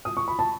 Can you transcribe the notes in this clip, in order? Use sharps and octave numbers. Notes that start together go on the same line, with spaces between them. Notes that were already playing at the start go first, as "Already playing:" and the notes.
D#6
C#6
B5
A5